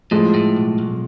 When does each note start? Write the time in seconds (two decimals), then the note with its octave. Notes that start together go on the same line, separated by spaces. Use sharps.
0.11 A2 F3 G#3
0.34 A2
0.56 B1
0.79 B1